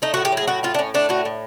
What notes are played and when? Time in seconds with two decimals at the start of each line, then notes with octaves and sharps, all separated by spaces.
0.02 A3 D#4
0.14 F#4
0.17 A2
0.25 G4
0.32 F#3
0.37 G#4
0.48 A2 F#4
0.63 A3 F4
0.74 D4
0.78 A2 C#4
0.94 A3 D4
1.09 A2 F#4
1.25 A2